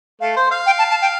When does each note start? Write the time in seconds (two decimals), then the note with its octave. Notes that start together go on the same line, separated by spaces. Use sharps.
0.20 A3 F5
0.36 C5
0.51 F5
0.66 G5
0.78 A5
0.90 A5
1.02 G5